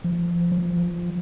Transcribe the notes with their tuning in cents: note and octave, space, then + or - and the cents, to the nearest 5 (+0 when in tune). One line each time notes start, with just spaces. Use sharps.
F3 -20
F3 -5